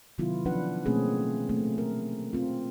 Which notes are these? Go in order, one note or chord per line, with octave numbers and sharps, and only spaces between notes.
C3 D#3 F#3 B3 E4 F4
F3 C#4 D4 B4 F#5
B2 A3 A#3 C4 C#4 G#4
A3 C4
A#4
C4 F4